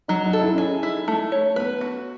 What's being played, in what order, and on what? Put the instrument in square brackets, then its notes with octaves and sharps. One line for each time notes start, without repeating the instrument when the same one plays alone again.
[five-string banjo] F#3 [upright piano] D#4
[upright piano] D#4
[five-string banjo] A4
[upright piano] E4
C#4
[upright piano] D#4 [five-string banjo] G#4
[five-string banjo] E4
A3
C#5
[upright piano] B3 [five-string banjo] B4
[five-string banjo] F#4